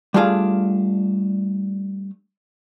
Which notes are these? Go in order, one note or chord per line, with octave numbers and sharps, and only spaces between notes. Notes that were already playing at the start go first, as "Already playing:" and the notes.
G3 A3 D4 F4 G#4 F5